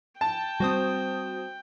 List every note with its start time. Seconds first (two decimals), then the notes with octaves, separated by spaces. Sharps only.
0.21 G5 A5
0.60 G3 B3 C4 F#4 C5 D#6